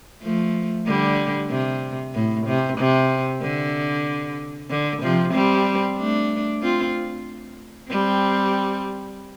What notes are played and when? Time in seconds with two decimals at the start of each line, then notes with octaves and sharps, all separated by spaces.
0.23 F3 A3
0.87 D3 G3
1.50 C3
2.15 A2
2.47 C3
2.78 C3
3.42 D3
4.70 D3
5.02 C3 F3
5.34 G3 C4
5.98 A3 D4
6.62 C4 F4
7.90 G3 C4